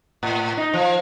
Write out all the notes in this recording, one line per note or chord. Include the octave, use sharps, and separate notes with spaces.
A2
D#4
F3